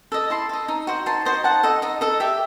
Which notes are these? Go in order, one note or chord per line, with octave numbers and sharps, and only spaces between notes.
A4 D#5
E4 A5 C6
A4 D#5
D#4
F#4 C5 D#5
D#4 A5 C6
F#4 C5 D#5
D#4 F#5 A5
A4 D#5
D#4 D#5
A4 D#5
G4 E5